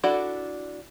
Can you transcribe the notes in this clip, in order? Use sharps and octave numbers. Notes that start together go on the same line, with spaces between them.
D4 E4 F#4 A4 D5